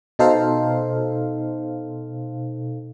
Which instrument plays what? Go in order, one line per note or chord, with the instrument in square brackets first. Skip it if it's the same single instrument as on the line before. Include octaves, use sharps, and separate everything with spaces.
[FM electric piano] B2 D#4 A4 C5 F5